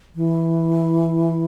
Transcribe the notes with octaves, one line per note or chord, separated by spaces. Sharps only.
E3